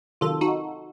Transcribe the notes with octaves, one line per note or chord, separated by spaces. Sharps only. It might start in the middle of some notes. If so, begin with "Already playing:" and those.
C3 D#3 F#3 F4 A4
D#4 F#4